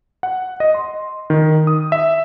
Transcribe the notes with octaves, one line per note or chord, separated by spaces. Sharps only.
F#5
D#5
C6
D#3
D#6
E5